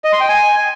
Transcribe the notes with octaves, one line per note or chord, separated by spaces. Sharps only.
D#5
C6
G5
G#5